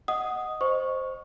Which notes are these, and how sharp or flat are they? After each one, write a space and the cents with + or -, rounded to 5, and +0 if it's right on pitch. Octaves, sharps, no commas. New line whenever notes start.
D#5 +0 F#5 +0 D#6 +0
C5 +0 D#5 -15 C#6 +0